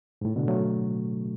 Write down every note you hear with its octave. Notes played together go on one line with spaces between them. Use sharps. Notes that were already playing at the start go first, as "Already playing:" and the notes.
G#2
A2
B2 D3
F#3 A3